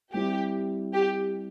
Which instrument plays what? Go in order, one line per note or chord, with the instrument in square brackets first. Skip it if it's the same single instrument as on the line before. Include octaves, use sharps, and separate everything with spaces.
[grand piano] G3 C4 E4 [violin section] G4
[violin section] G4